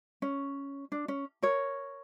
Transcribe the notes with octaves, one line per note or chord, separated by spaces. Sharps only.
C#4
D4
C#4
A#4 C#5